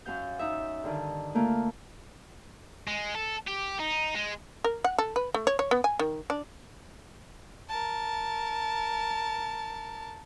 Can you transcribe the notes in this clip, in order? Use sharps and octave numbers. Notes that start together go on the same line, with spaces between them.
F#2 F#3 F5 G6
D#4 E5
G2 D3 D#3
A3 A#3 F4
G#3
A4
G4
D#4
G#3
A#4
F#5
A4
B4
A3
C#5
C#5
B3
G#5
D#3
D4
A#4 A5